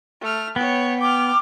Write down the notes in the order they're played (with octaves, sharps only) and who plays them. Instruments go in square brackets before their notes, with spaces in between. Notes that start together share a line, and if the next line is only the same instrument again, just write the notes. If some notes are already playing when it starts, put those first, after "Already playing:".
[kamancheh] A3 F6
[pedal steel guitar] B3 [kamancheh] C#5 G5
[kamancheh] G5 F6 [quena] D6